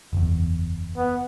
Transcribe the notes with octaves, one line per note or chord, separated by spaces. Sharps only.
F#1 E2
B3